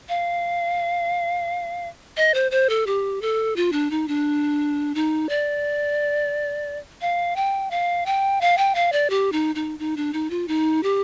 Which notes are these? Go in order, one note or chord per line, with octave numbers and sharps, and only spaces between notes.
F5
D#5
C5
C5
A4
G4
A4
F4
D4
D#4
D4
D#4
D5
F5
G5
F5
G5
F5
G5
F5
D5
G4
D#4
D#4
D#4
D4
D#4
F4
D#4
G4